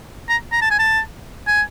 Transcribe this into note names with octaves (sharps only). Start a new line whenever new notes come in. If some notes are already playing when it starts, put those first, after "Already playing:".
A#5
A#5
A5
G#5
A5
G#5